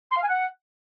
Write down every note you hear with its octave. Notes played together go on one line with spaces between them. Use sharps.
C6
F5
G#5
F#5